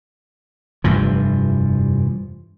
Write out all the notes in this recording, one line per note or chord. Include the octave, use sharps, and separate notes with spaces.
F1 G2 E3 F3